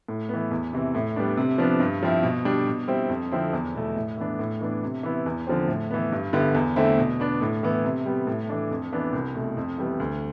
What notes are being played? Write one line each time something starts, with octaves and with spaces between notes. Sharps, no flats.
A2
E3 B3
E2
C3 E3
A2
G3 B3 D4
C3
F3 B3 D4
G2
F3 C4 E4
B2
G3 D4
B2
G3 C4 E4
F2
D3 F3 C4 E4
E2
B2 A3 E4
A2
E3 B3 D4
A2
E3 B3 D4
C3
E3 B3 E4
E2
D3 F3 C4
A2
E3 B3
G2
D3 G3 B3 E4
E2
D3 A3 C4 E4
B2
B3 D4
A2
E3 B3
C3
G3 B3
A2
E3 A3 D4
F2
E3 B3 D4
C2
B2 A3
F2
E3 G3 B3
D2